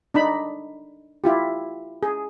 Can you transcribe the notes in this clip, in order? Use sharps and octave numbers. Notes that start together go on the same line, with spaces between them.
D4 D#4 B5
E4 F4 G4
G#4